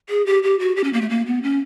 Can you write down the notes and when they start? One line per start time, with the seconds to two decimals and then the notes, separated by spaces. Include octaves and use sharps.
0.09 G#4
0.26 G4
0.43 G4
0.59 F#4
0.76 G4
0.84 C#4
0.93 A#3
1.01 A3
1.10 A#3
1.26 B3
1.43 C#4